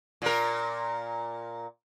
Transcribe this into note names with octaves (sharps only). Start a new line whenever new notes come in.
A#2 A#4